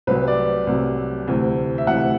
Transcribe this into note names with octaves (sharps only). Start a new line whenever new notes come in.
C2 C3 F#3 B4
D5
C2 C3 F#3
D2 C3 E3
E5
D2 C3 E3 F#5